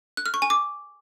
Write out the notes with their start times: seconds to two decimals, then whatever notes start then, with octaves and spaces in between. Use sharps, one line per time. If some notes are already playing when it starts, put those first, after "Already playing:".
0.17 F#6
0.26 F6
0.34 C#6
0.42 G#5
0.50 D6